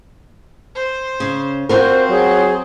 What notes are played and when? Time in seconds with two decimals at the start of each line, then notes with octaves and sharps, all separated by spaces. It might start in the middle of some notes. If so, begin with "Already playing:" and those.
0.75 C5
1.20 C#3
1.69 C4 F4 F#4 A#4 C5
2.10 F#3 G#4